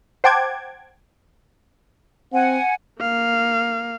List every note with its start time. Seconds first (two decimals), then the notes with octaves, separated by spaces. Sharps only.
0.24 C5 F#5 G5 A5 D6 G#6
2.33 C4 F#5 G#5
3.01 A#3 F5